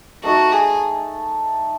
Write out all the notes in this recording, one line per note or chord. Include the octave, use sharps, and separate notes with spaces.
A3 D#4 F#4 A4
G#4